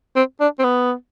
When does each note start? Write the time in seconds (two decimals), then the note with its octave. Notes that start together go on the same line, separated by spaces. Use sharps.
0.16 C4
0.40 D4
0.59 C4
0.64 B3